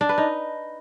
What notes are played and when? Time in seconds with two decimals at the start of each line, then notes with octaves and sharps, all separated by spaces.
0.01 D4
0.09 B4
0.18 D#4